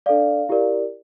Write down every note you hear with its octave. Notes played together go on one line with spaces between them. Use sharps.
D4 A4 D5 F5
E4 G4 A#4 D5